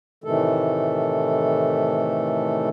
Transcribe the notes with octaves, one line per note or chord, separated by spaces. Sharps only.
A2 C3 D#3 E3 A3 A4